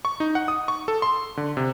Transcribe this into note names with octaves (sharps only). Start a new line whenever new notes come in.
C#6
D#4
F#5
D#6
C#6
A4
C6
D3
C3